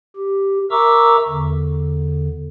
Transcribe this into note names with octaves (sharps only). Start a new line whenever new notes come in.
G4
A#4 E5 A#5 C#6 D6 E6
E2 D3